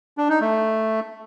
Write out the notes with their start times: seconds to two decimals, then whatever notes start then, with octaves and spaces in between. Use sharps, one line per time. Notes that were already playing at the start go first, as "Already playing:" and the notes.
0.18 D4
0.29 D#4
0.41 A3